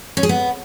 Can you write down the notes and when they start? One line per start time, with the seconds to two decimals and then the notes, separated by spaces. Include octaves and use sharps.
0.17 C#4
0.23 G#4
0.29 B3